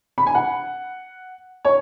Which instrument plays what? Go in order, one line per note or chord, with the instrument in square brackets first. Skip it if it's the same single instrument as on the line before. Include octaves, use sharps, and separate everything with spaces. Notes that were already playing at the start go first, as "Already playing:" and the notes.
[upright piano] B5
G#5
F#5
C#5